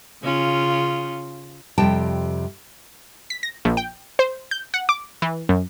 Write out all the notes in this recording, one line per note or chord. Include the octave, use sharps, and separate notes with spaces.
C#3 C#4 F4
F2 C3 G3 G5 A5
B6
A#6
A#1
G5
C5
G6
F#5
D6
E3
F#2